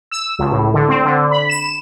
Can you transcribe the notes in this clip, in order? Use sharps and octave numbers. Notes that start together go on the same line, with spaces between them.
E6
C#2
A2
D3
C4
D3
B5
E7